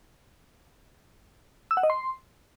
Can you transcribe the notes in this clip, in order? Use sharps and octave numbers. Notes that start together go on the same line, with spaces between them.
E6
F#5
D#5
C6